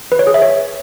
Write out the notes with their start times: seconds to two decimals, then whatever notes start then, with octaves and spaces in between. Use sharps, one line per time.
0.12 B4
0.19 C#5
0.27 G#4
0.34 E5
0.42 C#5